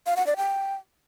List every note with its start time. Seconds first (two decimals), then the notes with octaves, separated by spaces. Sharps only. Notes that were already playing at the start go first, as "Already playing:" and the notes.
0.06 F5
0.17 F#5
0.27 D5
0.37 G5